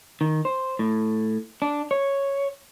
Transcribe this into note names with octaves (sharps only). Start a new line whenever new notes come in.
D#3
C5
A2
D4
C#5